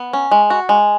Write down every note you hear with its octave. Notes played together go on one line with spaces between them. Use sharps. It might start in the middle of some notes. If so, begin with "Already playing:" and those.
Already playing: B3
C#4
G#3
F#4
G#3